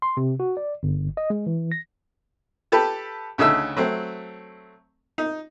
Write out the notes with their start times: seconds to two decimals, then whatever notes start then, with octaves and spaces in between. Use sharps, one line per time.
0.02 C6
0.17 C3
0.40 F#4
0.57 D5
0.83 G1
1.17 D#5
1.30 G#3
1.46 E3
1.72 A#6
2.72 G4 A4 B4
3.38 D2 C#3 D#4 A4 E5 E6
3.77 F#3 A3 C4
5.18 D#4